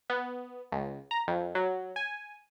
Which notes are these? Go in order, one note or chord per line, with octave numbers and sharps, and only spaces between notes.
B3
C#2
A#5
F2
F#3
G#5